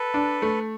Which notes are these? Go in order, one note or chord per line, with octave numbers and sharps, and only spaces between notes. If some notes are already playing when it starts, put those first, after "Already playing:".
Already playing: A4 B4
D4
A3